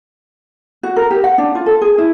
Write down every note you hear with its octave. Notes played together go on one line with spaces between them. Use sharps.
F#4
A#4
G4
F#5
D4
F4
A4
G#4
E4